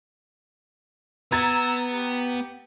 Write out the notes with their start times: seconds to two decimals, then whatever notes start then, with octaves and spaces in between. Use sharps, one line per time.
1.32 B3 A#5 E6 G#6 A6
1.92 G4